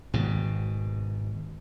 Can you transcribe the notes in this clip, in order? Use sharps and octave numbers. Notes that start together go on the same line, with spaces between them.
G#1 G#2 B2